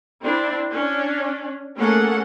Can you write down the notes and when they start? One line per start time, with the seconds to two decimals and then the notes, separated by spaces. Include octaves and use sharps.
0.22 C4 D4 E4
0.71 C#4 D4
1.77 A3 A#3 C#4 G#4 A4 F#5